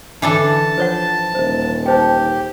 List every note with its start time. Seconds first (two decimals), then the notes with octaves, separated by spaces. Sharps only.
0.22 D3 E3 D4 A4 A5
0.78 F3 C5 C#5 F#5
1.35 D#1 C5
1.86 D#4 G4 C5 G5